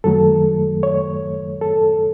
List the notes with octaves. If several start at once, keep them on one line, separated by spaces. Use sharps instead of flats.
F#2 D#3 F#3 A3 A4
C#5
A4